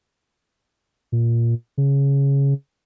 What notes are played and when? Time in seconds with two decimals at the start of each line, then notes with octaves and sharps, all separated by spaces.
1.12 A#2
1.78 C#3